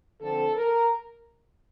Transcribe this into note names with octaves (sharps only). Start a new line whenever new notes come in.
D3 F3 C4 A4
A#4